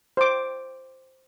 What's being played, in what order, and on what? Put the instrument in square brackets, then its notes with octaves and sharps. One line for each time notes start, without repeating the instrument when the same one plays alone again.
[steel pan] C5 D6